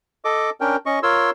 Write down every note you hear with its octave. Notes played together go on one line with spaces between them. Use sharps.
A4 D#5 D6
C#4 D4 A#4 G5
C#4 D#5 C#6
F4 A#4 C#5 C6 E6